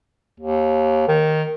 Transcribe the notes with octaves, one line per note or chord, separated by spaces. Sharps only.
D#2
D#3